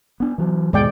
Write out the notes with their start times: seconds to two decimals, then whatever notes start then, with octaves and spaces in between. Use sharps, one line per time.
0.20 B3 D4
0.38 E3 F#3
0.73 D#2 G#2 B2 G#3 D5 G5